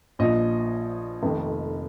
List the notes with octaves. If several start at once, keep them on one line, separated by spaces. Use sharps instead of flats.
A#1 A#2 F3 D#5
F1 F2 D#3